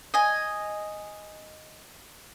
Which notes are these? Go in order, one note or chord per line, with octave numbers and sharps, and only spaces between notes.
D#5 G#5